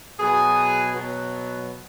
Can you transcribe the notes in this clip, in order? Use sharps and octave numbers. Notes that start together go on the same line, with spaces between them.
B2 F#3 G#4
B2 F#3